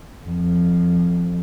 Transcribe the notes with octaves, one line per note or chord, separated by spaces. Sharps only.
F2